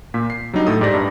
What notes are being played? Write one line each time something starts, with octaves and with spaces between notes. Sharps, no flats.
A#2 A#3 B6
C7
F#3 G3 D4 D#4
A2 A4 D#6
G#2 G4 D5 A#6
G2